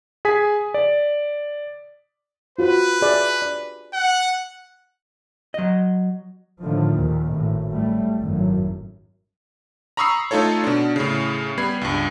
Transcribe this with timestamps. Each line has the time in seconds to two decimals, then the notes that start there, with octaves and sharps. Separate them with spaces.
0.25 G#4 G#5 B6
0.74 D5
2.59 F4 F#4 B4 C5
3.02 G#4 D5 E5
3.42 D5
3.94 F#5
5.54 F#3 D#5
6.62 A2 D3 D#3 F3
6.95 D#2 A#2
7.31 G#1 A2
7.72 A2 G3 A3
8.20 G#1 F#2 A2
9.97 A#5 B5 C#6 D#6 E6 C7
10.31 A3 D#4 F4 A4 C#5
10.64 B2 D4
10.96 A2 C#3
11.57 G3 B3 B5 G#6 C7
11.81 C#2 G2